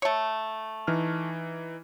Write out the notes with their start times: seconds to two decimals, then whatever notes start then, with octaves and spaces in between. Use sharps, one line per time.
0.02 A3 C#5
0.87 E3 D#4 F6